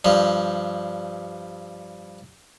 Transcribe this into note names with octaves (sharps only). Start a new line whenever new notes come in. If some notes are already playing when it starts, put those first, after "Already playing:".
G2 F3